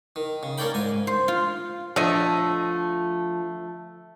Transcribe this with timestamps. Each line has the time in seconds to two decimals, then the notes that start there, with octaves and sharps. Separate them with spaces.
0.16 D#3
0.43 C#3
0.58 C#4 A#4 C#5 D5 G5 B5
0.74 G#2 G#5
1.07 C5
1.28 F4
1.96 D3 F3 A3 D#5